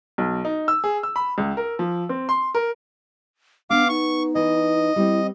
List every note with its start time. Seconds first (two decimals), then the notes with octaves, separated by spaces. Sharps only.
0.18 B1
0.45 D#4
0.68 E6
0.84 G#4
1.03 E6
1.16 B5
1.38 C#2
1.57 A#4
1.79 F3
2.09 C4
2.29 C6
2.55 A#4
3.70 B3 D4 F5 D6
3.89 D#4 C#6
4.35 E3 D#5
4.96 G3 C4 E4